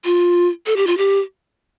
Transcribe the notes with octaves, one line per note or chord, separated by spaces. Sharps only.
F4
A4
G4
F4
G4